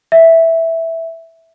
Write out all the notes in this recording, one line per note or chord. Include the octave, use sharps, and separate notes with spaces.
E5